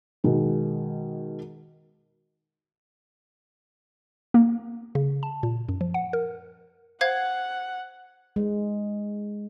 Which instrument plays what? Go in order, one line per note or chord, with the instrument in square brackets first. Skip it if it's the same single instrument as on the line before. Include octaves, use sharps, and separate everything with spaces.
[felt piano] B2 D#3 G#3
[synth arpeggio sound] A#3
[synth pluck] C#3
A5
A#2
F#2
F3
F#5
A#4
[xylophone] C5 F5 G#6 [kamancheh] F#5
[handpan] G#3